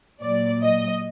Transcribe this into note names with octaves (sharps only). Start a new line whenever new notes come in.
A#2 F#3 D5
D#5